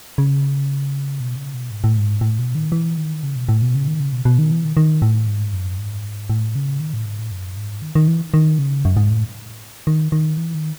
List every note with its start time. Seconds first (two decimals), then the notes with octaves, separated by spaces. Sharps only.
0.18 C#3
1.20 B2
1.36 C#3
1.54 B2
1.71 G#2
1.84 A2
1.97 G#2
2.21 A2
2.39 B2
2.55 D#3
2.72 E3
2.97 D#3
3.23 C#3
3.36 B2
3.49 A2
3.62 B2
3.75 C#3
3.87 D#3
4.00 C#3
4.13 B2
4.25 B2
4.39 D#3
4.51 E3
4.64 D#3
4.77 D#3
5.02 A2
5.27 G#2
5.53 F#2
5.78 G#2
6.30 A2
6.55 C#3
6.80 D#3
6.94 A2
7.05 G#2
7.19 A2
7.31 F#2
7.56 G#2
7.82 D#3
7.95 D#3
8.08 E3
8.34 D#3
8.59 C#3
8.85 F#2
8.97 G#2
9.11 A2
9.87 D#3
10.12 D#3
10.37 E3
10.55 D#3